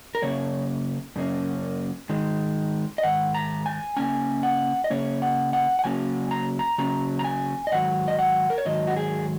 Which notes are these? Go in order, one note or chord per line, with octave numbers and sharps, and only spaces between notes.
A#4
F#2 C#3 A#3 C#4 C#5
F#2 C#3 A#3 C#4
G#2 D#3 G#3
D#5
G#2 D#3 F#5
A#5
G#5
C#3 A#3 C#4 G#5
F#5
D#5
C#3 A#3 C#4 C#5
F#5
F#5
F#5
C#3 F#3 A#3 C#4 G#5
A#5
A#5
C#3 F#3 A#3 C#4 A#5
A#5
G#5
D#5
G#2 D#3 F#3 F#5
D#5
F#5
A#4
C#5
G#2 D#3 F#3 D#5
F#4
G#4